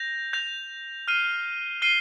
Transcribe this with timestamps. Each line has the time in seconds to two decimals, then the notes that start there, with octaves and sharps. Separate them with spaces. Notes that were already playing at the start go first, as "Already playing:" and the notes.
Already playing: G6 A#6 F7
0.33 G6 A#6 F7
1.08 F6 C7 D#7 G7
1.82 F6 C7 D#7 G7